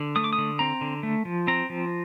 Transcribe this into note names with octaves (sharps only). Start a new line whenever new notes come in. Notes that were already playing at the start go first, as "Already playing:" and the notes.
Already playing: D3
A3 D#6
D6
D#6
D3
C4 A#5
D3
A3
F3
C4 A#5
F3